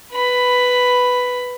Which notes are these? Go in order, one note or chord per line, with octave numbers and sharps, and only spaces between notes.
B4 B5